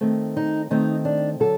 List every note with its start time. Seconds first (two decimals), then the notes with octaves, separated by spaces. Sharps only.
0.01 D#3 A3 C4
0.37 D#4
0.70 D#3 A3 C4 D#4
1.05 D4
1.40 D3 F#3 A4